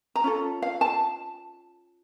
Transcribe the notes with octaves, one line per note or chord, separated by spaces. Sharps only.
A#5
C#4 F4 A4
F5
A5